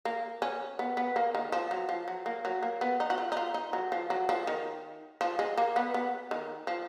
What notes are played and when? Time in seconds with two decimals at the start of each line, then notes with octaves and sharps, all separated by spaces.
0.05 A#3
0.42 C#4
0.79 B3
0.97 B3
1.16 A#3
1.35 D#3
1.52 F3
1.71 F#3
1.89 F3
2.08 F#3
2.26 A#3
2.45 F#3
2.63 A#3
2.81 B3
3.00 D#4
3.10 F#4
3.18 F4
3.32 D#4
3.37 F4
3.54 D#4
3.73 F#3
3.92 F3
4.10 F#3
4.29 F3
4.47 D#3
5.21 F3
5.39 G#3
5.58 A#3
5.76 B3
5.94 B3
6.31 D#3
6.67 F3